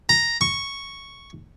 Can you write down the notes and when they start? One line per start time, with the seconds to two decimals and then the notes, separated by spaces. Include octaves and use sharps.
0.09 A#5
0.41 C#6